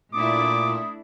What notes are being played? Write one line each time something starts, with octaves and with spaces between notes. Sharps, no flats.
A#2 A3 D4 E4 D6 D#6